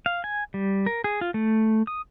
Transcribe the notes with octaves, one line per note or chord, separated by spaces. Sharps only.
F5
G#5
G3
A#4
G#4
F4
A3
D#6